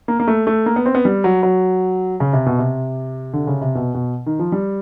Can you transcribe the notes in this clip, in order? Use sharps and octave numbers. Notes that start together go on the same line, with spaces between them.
A#3
A#3
A3
A3
A#3
B3
C4
B3
G3
F#3
F#3
C#3
C3
B2
C3
D3
C#3
C3
B2
B2
D#3
F3
G3